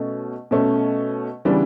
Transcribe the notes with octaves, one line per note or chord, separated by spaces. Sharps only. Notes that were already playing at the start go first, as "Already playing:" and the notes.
Already playing: B2 A3 C#4
B2 A3 C#4
C#3 E3 G3 B3 D4